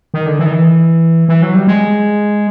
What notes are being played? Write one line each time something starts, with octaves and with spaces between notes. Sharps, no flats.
D#3
D3
E3
D#3
E3
E3
F#3
G3
G#3